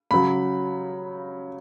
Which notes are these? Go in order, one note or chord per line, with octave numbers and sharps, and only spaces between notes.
C#3 F#3 B5